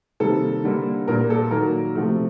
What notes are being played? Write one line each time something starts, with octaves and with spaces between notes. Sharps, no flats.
C3 D#3 G3 A#3 A4
D3 G3 A#3
A#2 G3 A#3 A#4
A4
D#3 F#3 A#3 A#4
C3 F3 A3